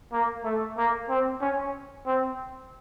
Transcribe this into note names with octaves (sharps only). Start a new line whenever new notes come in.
A#3
A3
A#3
C4
C#4
C4